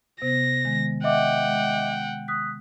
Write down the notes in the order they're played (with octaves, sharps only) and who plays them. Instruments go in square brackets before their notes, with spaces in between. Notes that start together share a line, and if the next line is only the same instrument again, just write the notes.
[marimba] C3 B3 C5 [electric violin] A#6
[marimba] D#3 G#3
[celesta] D#5 E5 D6 [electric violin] F#5 G5
[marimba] G#3
[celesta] D#6 F#6 B6